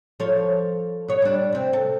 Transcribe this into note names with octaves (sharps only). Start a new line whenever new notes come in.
F3 A4 C#5
B2 C#5
G3 D4
C3 C4
A4